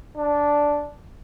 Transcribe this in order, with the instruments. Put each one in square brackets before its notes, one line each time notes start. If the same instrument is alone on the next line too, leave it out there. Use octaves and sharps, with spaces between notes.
[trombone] D4